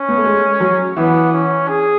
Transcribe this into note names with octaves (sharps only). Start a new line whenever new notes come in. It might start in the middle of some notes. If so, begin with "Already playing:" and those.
Already playing: C#4
B3
A3
G#3
F#3
E3 B3
C#4
G#4